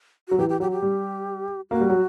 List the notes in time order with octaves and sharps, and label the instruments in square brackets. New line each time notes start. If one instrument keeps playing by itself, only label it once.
[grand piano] F#3 [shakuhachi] F#4
[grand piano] E3 [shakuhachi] G4
[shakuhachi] G4
[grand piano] F#3 [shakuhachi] G4
[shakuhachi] G4
[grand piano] G3
[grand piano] A#3 [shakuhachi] F#4
[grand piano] G3
F#3